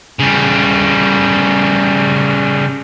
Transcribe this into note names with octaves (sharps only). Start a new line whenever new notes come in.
C#3 G3